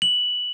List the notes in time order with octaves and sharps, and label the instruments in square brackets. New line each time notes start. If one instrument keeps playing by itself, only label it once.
[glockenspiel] F#7